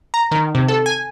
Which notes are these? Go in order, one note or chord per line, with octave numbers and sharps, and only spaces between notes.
A#5
D#3
C3
A4
G#5